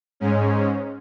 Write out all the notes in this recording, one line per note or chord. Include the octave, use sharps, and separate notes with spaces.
G#2 G#3 C#4